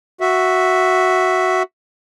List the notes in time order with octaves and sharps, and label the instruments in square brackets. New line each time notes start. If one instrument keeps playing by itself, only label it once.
[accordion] F#4 E5